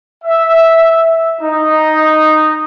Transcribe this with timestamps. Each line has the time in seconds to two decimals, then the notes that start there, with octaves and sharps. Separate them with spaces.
0.24 E5
1.41 D#4